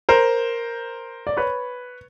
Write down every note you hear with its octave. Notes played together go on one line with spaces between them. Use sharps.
A#4 C5
D5
B4 C#5